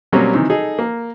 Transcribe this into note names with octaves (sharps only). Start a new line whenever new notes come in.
B2 F#3 G3 A#3 C4 C#4
C3 D#3 E3
D#4 G#4 A4
A#3